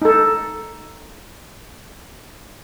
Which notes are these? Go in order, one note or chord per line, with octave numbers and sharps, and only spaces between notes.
D#4 A4